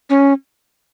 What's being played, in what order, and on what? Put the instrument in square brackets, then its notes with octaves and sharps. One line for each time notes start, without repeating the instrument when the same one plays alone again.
[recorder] C#4